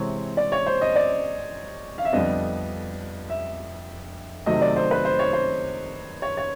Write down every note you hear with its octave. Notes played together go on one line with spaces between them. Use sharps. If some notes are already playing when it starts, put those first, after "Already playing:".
Already playing: C3 E3 G#3 C4 C#5
D5
C#5
C5
D#5
D5
F5
E5
F2 D3 G3 B3 D4 D#5
E5
C3 D#3 F#3 A3 C4 D#5
D5
C5
B4
C5
C#5
C5
C#5
C#5